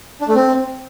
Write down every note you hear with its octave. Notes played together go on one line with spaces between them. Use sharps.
D4
A3
C4